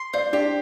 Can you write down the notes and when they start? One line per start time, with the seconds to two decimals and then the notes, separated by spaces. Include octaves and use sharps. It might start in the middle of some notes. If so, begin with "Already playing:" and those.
Already playing: C6
0.13 C5 D5
0.33 D4 G4